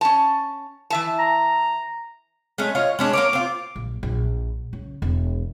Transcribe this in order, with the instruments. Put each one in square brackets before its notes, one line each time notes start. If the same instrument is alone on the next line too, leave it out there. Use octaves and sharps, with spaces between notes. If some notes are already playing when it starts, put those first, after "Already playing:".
[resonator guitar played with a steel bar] C#4 A5
E3 E5 A5
[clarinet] A#5
[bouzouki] G#3 A3 C#4
F4 C#5 D#5
G#3 C#4 D4
[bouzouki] A#3 A#4 C#5 [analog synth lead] D6
[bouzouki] C4 F4
[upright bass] A#1
A#1
C#3
E1